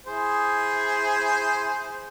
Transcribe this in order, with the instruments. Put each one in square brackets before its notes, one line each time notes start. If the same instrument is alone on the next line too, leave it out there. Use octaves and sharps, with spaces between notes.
[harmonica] E4 G#4 C5